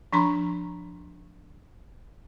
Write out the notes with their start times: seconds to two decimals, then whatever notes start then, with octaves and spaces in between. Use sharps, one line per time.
0.13 F3 D4 A#5 C6